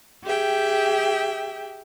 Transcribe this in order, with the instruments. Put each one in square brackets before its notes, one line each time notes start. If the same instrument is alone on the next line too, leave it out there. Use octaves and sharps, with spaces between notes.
[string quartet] G4 G#4 E5 G5